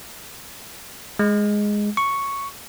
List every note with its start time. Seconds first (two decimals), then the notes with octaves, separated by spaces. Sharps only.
1.19 G#3
1.97 C#6